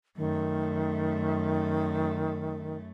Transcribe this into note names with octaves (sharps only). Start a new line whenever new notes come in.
F#2 D#3 A3